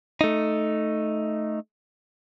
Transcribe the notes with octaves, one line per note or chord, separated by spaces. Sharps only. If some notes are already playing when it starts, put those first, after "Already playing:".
A3 D#4